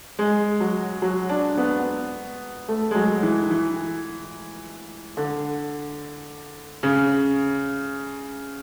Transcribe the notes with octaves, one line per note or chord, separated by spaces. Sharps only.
G#3
F#3
F#3
D4
B3
A3
G#3
F#3
E3
E3
D3
C#3